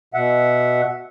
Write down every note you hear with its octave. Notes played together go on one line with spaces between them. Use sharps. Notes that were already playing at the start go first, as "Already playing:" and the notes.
B2 E5 F#5